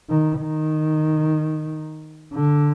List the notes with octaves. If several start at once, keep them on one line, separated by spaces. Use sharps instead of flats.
D#3
D#3
D3